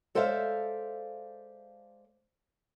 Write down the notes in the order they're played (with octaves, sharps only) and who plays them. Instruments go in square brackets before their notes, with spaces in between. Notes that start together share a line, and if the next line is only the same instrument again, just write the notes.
[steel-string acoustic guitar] G#3 A4 C5 D5 E5 F5